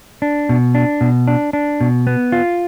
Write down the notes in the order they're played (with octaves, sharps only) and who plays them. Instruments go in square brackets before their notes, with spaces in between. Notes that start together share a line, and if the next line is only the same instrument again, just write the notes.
[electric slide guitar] D4
B2
D4
B2
D4
D4
B2
B3
F4